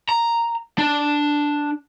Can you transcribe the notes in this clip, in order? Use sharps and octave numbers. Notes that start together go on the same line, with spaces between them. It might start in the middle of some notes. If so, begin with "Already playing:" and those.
A#5
D4